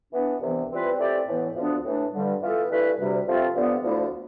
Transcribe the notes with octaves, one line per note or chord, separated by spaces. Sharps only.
E3 B3 D4
C2 C3 E3 B3
E3 G3 C4 F4 B4
E3 A3 C4 G4 D5
A2 E3 B3
D2 D3 F3 B3 D4
A2 E3 A3 D4
G2 D3 G3
E3 B3 F4 A4
G2 E3 A3 E4 B4
D2 C3 G3
C3 F3 A3 C4 F4
G2 D3 F3 B3
D2 D3 F3 A3 E4